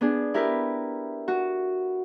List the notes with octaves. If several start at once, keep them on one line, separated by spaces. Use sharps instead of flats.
B3 D4 G#4
E4 G4 A#4 B4
F#4